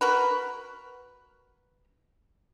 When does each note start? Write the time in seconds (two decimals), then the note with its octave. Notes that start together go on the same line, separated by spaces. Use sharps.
0.01 F#4 A#4 B4